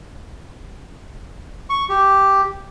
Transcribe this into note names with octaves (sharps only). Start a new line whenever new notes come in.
C#6
G4